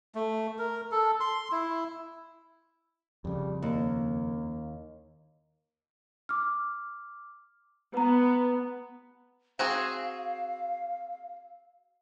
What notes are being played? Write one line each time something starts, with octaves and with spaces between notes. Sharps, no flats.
A3
A#4
A4
C6
E4
F2 C#3 G3
D#2 A#3
D6 F6
B3 B4 A#5
C4 F#4 G#4 F5